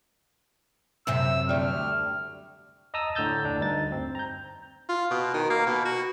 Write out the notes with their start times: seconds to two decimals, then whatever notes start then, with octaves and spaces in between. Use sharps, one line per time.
1.07 F#2 C3 G4 E6
1.49 D2 G3 F6
2.94 D#5 A5 A#5 D#6 E6
3.15 A2 D3 A#5 E6 G6 A6
3.45 D4
3.59 D2 G2 D#4 A6
3.92 C4
4.15 A#5 G6
4.89 F4
5.11 B2
5.34 D#3
5.50 A#3
5.67 B2
5.85 F#4